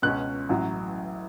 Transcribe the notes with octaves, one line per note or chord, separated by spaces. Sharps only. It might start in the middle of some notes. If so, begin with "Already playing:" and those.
C#2 B2 G#3 C#4 F#6
A1 A2 F#3